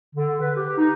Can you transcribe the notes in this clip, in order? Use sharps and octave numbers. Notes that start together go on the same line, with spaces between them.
D3
B4
G4
D#4